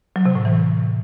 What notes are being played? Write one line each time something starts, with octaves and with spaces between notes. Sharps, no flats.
F#3
C3
A2
E3